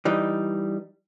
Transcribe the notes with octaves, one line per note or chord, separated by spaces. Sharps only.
E3 G3 D#4